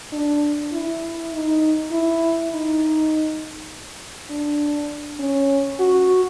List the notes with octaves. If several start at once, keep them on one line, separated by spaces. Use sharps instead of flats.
D4
E4
D#4
E4
D#4
D4
C#4
F#4